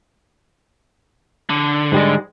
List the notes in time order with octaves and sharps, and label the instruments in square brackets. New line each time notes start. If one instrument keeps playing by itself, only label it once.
[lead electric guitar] D3
[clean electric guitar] G#2 G3 G#3